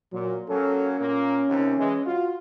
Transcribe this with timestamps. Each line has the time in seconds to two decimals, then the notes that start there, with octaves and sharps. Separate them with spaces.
0.13 A#2 F#3
0.49 F#3 A#3 C#4 A4
0.99 A#2 A#3 C#4
1.48 D#2 C3
1.77 E3 G#3
2.06 F4 F#4